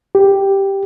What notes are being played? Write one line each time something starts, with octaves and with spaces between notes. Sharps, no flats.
G4